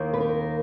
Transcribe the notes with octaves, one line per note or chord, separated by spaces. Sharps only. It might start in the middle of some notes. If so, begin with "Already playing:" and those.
Already playing: D#2 D#3 A#3
B4
A#4